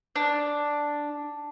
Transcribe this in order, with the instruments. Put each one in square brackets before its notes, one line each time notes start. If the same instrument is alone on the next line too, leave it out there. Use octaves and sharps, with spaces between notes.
[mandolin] D4